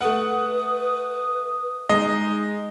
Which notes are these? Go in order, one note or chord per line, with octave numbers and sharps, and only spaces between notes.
A3 B4 F#5 D#6
G#3 D#4 D#5